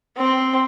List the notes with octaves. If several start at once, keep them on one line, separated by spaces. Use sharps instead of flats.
C4